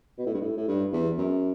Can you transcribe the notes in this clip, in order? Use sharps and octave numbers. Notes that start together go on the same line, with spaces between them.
B2
A2
G2
A2
A2
G2
E2
F#2